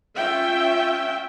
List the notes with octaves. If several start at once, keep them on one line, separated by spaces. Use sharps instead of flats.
C#4 F4 E5 G5